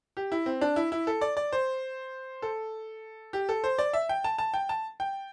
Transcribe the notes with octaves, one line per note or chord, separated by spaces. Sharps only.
G4
E4
C4
D4
E4
E4
A4
D5
D5
C5
A4
G4
A4
C5
D5
E5
G5
A5
A5
G5
A5
G5